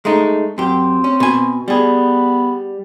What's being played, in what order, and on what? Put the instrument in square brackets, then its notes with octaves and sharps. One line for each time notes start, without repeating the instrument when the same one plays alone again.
[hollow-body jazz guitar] G#3 A3 D#4
[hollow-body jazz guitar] F#2 G4 [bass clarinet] C4
[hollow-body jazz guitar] C#4
B2 G#5
[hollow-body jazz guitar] G3 G#4 [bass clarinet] B3